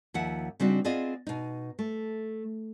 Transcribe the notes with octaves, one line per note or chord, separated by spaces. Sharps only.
D#2 F3 E5 F#5
C#3 G3 C4 D4 D#4 F#4
B3 C4 F4 G#4 D5 D#5
B2 D#4
A3